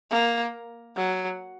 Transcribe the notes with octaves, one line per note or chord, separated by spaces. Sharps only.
A#3
F#3